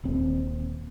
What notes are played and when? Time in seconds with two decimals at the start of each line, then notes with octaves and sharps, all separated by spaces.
0.04 D#1 D#2 C4